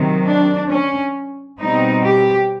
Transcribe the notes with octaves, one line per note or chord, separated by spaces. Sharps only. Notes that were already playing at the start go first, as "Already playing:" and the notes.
Already playing: C3 D#3 F#3
D4
C#4
B2 G3 C4 D#4
G4